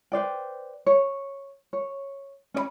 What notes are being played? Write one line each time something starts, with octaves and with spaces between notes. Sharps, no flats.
B4 C5 D5 G5
C#5
C#5
C#4 D5 B5